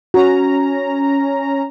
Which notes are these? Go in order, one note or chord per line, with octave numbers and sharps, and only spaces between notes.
C#4 F#4 A#5